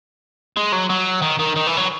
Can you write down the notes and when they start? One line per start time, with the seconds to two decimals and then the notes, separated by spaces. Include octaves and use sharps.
0.57 G#3
0.72 F#3
0.90 F#3
1.22 D#3
1.39 D#3
1.56 D#3
1.67 E3
1.77 F#3